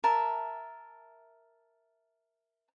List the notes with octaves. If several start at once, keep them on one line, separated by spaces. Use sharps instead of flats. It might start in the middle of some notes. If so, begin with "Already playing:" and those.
A#4 E5 A5